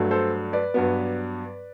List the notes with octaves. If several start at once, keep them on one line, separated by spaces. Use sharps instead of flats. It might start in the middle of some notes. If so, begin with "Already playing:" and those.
Already playing: G2 F#3 A3
A4 C5
B4 D5
G2 F#3 B3